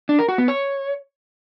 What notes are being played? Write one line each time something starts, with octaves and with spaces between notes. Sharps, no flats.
D4
A#4
F#4
B3
C#5